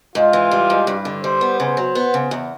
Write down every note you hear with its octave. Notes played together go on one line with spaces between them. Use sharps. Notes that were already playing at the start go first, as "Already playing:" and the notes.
G#2 F4
E3
G3
G#2
G2
D3
G3 C5
B3
C#3 C5
F#3
B3
C#3
E2